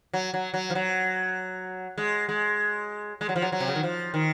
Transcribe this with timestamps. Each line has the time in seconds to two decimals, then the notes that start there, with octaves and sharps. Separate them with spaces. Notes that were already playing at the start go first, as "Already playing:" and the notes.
0.14 F#3
0.34 F#3
0.54 F#3
0.70 F3
0.75 F#3
1.98 G#3
2.29 G#3
3.21 G#3
3.29 F#3
3.36 F3
3.42 F#3
3.52 F#3
3.60 C3
3.68 C#3
3.75 D#3
3.83 F3
4.14 D#3